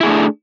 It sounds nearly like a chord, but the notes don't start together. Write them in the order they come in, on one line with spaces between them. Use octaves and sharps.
E4 G#4 A3 D4